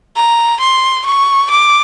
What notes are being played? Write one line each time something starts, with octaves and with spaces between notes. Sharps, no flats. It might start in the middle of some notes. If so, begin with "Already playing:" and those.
A#5
C6
C#6
D6